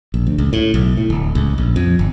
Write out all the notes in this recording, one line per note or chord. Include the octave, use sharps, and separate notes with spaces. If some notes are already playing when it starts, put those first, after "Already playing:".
A#1
D2
C#2
A2
B1
A2
D1
C#2
A#1
F2
G1